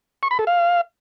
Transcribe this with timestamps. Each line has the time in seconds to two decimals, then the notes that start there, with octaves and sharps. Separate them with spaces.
0.23 C#6
0.31 B5
0.39 A4
0.47 F5